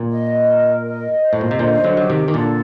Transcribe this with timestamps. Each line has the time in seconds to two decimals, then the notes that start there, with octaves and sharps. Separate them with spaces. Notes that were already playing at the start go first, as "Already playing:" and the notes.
Already playing: A#2
0.10 D#5
0.46 A#4
0.84 D#5
1.21 C5
1.33 A2
1.41 A#2
1.51 C3
1.59 A#2 D3 D#5
1.84 D3 F#3
1.97 F#3 G4
2.10 C3 D#3
2.28 D#3
2.34 A#2 D3 A4